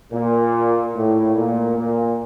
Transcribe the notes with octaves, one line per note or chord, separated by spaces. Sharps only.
A#2
A2
A#2
A#2